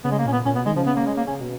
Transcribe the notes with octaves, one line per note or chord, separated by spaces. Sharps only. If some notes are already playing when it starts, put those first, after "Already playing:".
C#3 B3
G#3
A#3
A#2 C#4
B3
A#2 C#4
B2 B3
D#3 G#3
C#3 F3
B3
A#3
G#3
A#3
C#3 C#4
B2